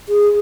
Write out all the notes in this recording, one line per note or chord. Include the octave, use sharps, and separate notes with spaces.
G#4